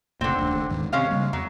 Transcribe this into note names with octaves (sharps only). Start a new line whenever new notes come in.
F1 A#2 D3 C4
D#1 D2
D#2 G#2 D#3
C3 G#3 C#4 F5
C#3 G3 A#3
E2 F#3